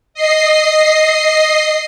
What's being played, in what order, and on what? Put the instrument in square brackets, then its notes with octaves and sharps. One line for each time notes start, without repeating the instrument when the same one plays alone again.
[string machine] D#5 C7